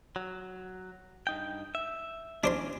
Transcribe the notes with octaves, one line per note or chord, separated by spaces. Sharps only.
F#3
G2 D#4 G5
E5
E3 C#4 D4 C5 C6